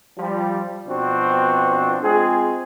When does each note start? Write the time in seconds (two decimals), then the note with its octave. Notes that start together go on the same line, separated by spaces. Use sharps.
0.17 F3 G3
0.87 B2 F3 C4 D4 F#4
2.01 G#3 C4 F4 G#4